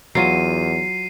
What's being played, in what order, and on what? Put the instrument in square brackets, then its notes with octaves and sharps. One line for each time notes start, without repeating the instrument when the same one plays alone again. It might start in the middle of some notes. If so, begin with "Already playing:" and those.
[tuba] E2 [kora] F#3 F4 [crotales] C7 D#7